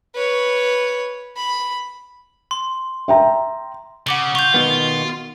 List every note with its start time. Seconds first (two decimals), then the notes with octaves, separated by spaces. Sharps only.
0.15 B4 C#5
1.37 B5
2.51 C6
3.08 E5 G5 A#5
4.07 C#3 F#5 D6 G7
4.35 F4 C#6 G6
4.54 B2 D#3 B3